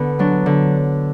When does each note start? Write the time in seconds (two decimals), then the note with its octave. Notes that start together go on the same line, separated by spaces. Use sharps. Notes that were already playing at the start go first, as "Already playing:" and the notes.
Already playing: D3 B3
0.19 F#3 D4
0.46 D3